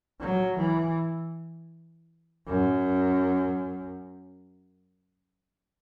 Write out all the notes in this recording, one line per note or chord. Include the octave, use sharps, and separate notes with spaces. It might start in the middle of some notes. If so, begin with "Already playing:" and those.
F#3
E3
F#2